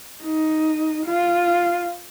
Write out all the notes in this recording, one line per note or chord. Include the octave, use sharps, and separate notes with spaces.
D#4
F4